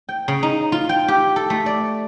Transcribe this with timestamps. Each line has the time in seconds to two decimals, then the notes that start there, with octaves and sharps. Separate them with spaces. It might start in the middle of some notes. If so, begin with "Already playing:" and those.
0.09 G5
0.28 C#3
0.43 D#4
0.72 F4
0.89 G5
1.08 G4
1.36 A4
1.50 A3
1.66 D5